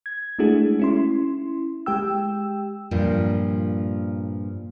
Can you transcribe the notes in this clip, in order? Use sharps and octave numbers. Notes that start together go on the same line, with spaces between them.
G#6
G#3 A3 D4 E4 F#4 G#4
C#4 E4 C6
G#3 G4 G5 E6
G2 A#2 F3 G3